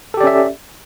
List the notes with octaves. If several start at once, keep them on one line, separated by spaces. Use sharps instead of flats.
C#4 G4 A4 D5 E5